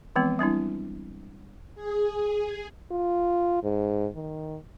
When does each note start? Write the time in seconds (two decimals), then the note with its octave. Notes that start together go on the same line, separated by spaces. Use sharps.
0.16 E3 F3 G#3 B3 C4
0.39 G3 C4 D4 E4
1.75 G#4
2.91 F4
3.63 G#2
4.15 D#3